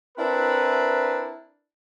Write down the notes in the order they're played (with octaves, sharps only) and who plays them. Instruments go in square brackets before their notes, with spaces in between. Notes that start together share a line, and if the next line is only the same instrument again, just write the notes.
[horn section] C4 D4 E4 A#4 B4